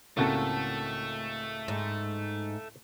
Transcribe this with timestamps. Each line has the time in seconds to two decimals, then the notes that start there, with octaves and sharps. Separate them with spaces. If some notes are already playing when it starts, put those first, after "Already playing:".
0.17 C#2 A2 A3 A#3 C4 F#4 A4
1.68 G#2